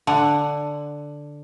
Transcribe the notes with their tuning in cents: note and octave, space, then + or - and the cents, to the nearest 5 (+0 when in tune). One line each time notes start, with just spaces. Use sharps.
D3 +0 F#5 +5